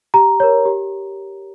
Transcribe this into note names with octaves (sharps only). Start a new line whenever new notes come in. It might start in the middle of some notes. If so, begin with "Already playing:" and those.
G4 A#5
A#4 C#5
G4